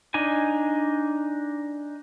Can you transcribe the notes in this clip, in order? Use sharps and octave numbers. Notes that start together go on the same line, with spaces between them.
D4 D#4 G#5